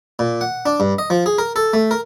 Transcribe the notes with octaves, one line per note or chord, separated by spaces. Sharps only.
A#2
F#5
D4
G2
D#5
F3
G#4
A#4
A4
A3
A#4